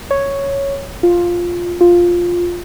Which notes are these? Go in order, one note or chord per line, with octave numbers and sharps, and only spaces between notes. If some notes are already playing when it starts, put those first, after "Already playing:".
C#5
F4
F4